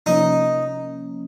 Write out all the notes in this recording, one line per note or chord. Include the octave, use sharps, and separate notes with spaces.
C3 F3 A#3 C#4 D#4